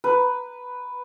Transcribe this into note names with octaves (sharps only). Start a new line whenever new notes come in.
B4